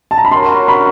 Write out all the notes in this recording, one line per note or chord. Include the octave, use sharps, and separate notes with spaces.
A5
A#5
B5
F#4 A#4 C#5 C6
B5